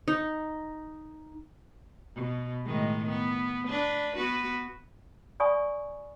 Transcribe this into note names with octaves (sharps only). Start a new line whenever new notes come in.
D#4
B2
A2 D#3 G#3
B3
D4 B4
B3 F#4 B4
D5 F5 G#5 B5 C#6 D#6